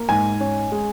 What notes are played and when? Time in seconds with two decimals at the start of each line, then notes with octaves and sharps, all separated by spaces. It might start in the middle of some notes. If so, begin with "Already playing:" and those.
Already playing: A#3
0.09 G#2 G#5
0.40 C#4
0.72 G#3